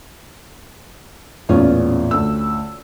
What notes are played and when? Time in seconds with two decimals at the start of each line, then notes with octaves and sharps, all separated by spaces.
1.49 A1 E2 A#2 C#4 F4 D5
2.11 D2 E6